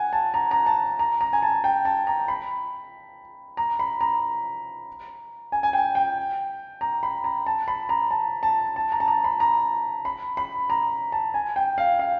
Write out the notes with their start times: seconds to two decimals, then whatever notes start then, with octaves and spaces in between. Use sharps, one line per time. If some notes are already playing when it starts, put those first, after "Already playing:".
Already playing: F#5 G#5
0.13 A5
0.34 A#5
0.51 A#5
0.66 A5
0.99 A#5
1.21 A#5
1.33 G#5
1.43 A5
1.64 G5
1.85 A5
2.07 A#5
2.28 B5
3.57 A#5
3.79 B5
4.01 A#5
5.52 G#5
5.63 G#5
5.73 G5
5.95 G5
6.81 A#5
7.03 B5
7.24 A#5
7.46 A5
7.68 B5
7.89 A#5
8.11 A5
8.43 A5
8.76 A5
8.92 A#5
9.00 A5
9.08 A#5
9.24 B5
9.40 A#5
10.05 B5
10.37 B5
10.70 A#5
11.12 A5
11.34 G#5
11.56 G5
11.78 F5
11.99 F5